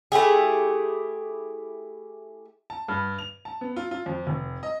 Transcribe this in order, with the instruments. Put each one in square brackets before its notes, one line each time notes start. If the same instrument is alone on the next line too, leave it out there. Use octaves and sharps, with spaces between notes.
[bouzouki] A3 E4 G4 G#4
[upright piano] A5
G2
F7
A5
B3
F4
F4
F2
F1
D#5